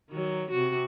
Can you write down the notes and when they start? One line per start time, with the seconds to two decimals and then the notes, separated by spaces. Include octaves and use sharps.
0.10 D#3 F#3
0.51 C3 F#4